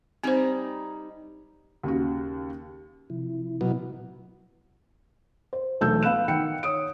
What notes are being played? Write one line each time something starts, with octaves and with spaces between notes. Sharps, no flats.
G3 C4 D#4 C5 A#5
D#2 C#3 F#4
C3 F3 E4
B2 F#3
C5
E1 B1 A3 E6 G6
B3 F5 B5 F#6 E7
D#3 F#5 G5 C#7
C#5 D#6 D7